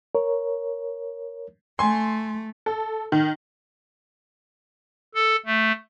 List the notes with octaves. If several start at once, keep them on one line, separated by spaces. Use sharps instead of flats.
A#4 C#5
A3 G#5 C6
A4
D#3
A4
A3